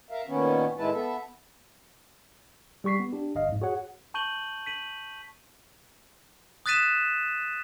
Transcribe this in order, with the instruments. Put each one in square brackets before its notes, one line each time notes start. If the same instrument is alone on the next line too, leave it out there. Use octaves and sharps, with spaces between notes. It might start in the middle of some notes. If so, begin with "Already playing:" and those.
[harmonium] A#4 E5 F5
A#2 D#3 B3 C#4
A2 D#3 G#3 E4 B4 A5
B3 A4 E5
[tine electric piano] G3 G4 C#6 B6 C7
B3
D4 G4
G1 D#5 F5
F2 G#2
F#4 G#4 C#5 F#5
[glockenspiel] A5 C#6 G6 D#7 F#7 G7
B6 D#7 F#7
D#6 F#6 A6 B6 D#7 E7